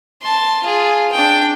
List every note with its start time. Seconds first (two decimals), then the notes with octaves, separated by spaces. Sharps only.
0.21 A5 C6
0.63 F4 G#4
1.12 D4 G5